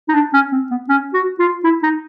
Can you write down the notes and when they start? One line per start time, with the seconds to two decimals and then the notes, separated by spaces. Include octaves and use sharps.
0.09 D#4
0.14 D4
0.33 C#4
0.52 C4
0.71 B3
0.89 C#4
1.14 F#4
1.39 F4
1.64 E4
1.83 D#4